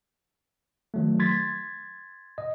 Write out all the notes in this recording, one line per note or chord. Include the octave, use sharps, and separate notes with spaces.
D#3 F#3 A3
C6 G#6 A6 B6
D#5